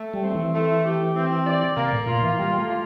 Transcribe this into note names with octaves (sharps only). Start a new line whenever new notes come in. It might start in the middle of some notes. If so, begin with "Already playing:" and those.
Already playing: A3
G3
C4
E3
A3
G4
C4
D5
C3 A#3
A2
A#2 F4
E3
G3 A#3
A3
F4